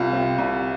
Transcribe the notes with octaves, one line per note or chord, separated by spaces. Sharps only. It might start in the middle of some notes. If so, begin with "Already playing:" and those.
Already playing: C2 F4
C3
C2